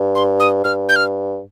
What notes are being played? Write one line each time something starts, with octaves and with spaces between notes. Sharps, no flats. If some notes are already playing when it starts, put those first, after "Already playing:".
Already playing: G2
C6
D#6
G2 F6
G6
F6